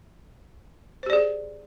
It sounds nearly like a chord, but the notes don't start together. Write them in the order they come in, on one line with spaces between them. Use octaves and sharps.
C5 G4 D5 G#4